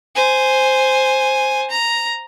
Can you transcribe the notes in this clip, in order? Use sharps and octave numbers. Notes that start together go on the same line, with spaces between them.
C5 G#5
A#5